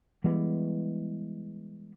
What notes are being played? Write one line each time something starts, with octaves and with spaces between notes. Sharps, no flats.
E3 G3 G#3 B3